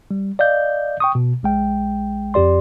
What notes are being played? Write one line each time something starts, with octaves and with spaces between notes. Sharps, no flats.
G3
D5 D#5 F5 G6
G5 C#6 D#6
B2
A#1 G#3 G5
F2 G4 D5 C6